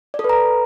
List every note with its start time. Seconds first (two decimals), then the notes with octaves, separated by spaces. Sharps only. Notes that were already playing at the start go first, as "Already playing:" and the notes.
0.14 D5
0.19 A4
0.24 B4
0.29 A#5